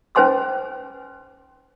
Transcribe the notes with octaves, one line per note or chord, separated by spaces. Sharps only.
C#4 B4 C5 G#5 C6 E6